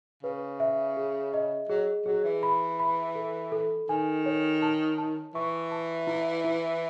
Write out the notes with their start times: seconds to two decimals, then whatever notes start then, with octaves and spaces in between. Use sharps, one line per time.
0.23 C#3 B4
0.60 E5
0.97 G#4
1.34 D#5
1.69 F#3 G#4
2.06 F#3 G#4
2.24 E3
2.43 B5
2.80 B5
3.15 A4
3.52 A4
3.89 D#3 G#5
4.26 C#5
4.62 A5
4.98 A5
5.35 E3 C#6
5.71 A5
6.07 E4
6.44 E4